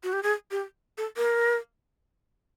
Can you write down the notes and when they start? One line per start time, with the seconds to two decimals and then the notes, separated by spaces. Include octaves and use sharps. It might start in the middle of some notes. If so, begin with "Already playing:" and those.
0.04 F#4
0.13 G4
0.23 G#4
0.51 G4
0.98 A4
1.17 A#4